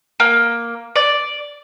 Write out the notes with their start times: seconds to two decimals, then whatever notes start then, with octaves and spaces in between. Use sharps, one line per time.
0.20 A#3
0.96 D5